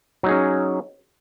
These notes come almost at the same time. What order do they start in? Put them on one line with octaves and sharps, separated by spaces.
F#3 D#4 G#4 C#4